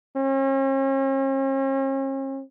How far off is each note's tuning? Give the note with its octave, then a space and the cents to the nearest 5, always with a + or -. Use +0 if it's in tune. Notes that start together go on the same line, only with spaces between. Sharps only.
C#4 -45